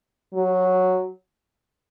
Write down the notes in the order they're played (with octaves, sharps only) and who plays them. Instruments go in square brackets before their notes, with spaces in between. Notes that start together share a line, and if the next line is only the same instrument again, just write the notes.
[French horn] F#3